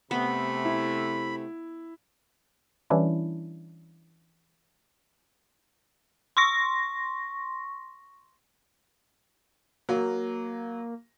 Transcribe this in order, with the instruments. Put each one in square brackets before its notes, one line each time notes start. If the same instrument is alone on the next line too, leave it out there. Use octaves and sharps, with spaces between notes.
[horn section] C3 A3 [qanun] B3 [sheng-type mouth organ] B5
[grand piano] E4
[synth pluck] E3 G3 C#4 D4 E4
[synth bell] C6 C#6 A#6
[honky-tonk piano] F#3 [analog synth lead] A#3